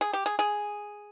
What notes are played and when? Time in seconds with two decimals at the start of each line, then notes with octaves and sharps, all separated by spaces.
0.01 G#4
0.13 G4
0.26 G#4
0.39 G#4